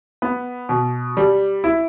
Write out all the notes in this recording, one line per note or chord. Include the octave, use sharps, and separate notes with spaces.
B3
B2
G3
E4